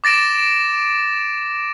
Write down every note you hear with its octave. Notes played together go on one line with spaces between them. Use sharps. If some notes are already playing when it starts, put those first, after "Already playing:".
D6 A6 A#6 D7 E7